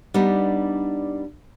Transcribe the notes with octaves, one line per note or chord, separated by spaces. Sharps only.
G3 B3 D4 D#4